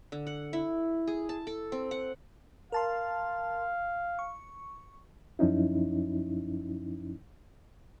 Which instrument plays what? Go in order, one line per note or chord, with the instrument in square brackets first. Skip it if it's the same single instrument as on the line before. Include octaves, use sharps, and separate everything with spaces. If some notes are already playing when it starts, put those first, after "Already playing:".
[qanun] D3
F#5
E4
G#4
A5
A4
C4
F#5
[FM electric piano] A#4 A5 C6 [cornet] F5
[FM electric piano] C#6
[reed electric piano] F#2 F3 C#4 D#4 E4